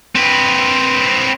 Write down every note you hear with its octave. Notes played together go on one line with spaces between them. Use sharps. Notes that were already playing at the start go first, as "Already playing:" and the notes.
C4 B4